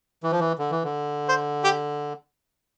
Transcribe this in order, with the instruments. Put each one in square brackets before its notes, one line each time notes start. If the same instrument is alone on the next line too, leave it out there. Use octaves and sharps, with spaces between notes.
[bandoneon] E3
F3
E3
D3
E3
D3
[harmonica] C5
G4